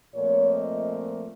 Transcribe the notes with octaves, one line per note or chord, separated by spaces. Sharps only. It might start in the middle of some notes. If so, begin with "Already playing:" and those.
A#2 F3 A3 C4 C#5
D#5